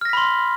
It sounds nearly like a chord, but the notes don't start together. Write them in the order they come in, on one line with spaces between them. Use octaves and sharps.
F6 A#6 B6 B5 C6